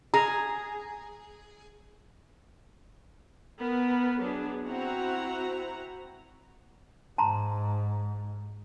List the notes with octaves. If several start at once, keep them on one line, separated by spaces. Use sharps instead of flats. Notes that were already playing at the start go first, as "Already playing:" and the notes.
G#4 A#5
B3 A#4
F#3 B3 D4 G#4
C4 E4 F#4 F#5 A#5
G#2 A5 A#5 C6